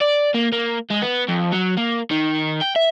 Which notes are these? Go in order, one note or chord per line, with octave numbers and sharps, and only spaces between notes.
D5
A#3
A#3
G#3
B3
F2
F#3
A#3
D#3
G5
E5